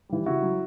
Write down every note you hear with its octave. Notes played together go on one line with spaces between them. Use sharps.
E3 G3
C#3 E4 F#4
F#3